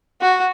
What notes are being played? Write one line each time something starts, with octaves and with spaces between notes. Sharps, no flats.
F#4